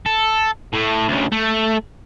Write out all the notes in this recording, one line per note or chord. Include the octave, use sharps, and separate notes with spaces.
A4
A2 A3
D2 C#3
A3